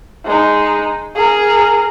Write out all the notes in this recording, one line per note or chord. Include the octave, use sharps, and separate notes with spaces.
G#3 D#4
G#4 A#4